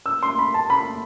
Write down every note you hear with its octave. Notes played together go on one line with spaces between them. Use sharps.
E6
C6
B5
A5
B5